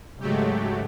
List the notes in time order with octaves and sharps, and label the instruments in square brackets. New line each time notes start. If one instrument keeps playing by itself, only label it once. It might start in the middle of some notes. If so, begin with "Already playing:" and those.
[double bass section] G#2 C#3 G#3 [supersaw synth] F#3 A3 G4